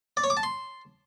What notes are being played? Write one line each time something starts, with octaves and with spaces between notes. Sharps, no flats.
D5
C#5
D6
A5
C6